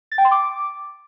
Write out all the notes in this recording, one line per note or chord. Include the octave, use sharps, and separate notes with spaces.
A6
G5
C6
D6